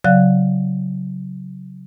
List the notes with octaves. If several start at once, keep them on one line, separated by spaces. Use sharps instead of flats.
C#3 F#3 D5 F5 F#6